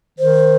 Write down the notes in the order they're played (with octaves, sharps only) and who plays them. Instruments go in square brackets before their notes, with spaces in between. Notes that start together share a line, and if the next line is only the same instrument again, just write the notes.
[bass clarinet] D#3 [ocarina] C5